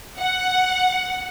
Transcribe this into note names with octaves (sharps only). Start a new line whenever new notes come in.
F#5